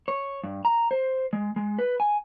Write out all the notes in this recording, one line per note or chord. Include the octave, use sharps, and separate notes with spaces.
C#5
G2
A#5
C5
G#3
G#3
B4
G#5